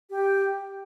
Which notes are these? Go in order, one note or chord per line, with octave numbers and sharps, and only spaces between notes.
G4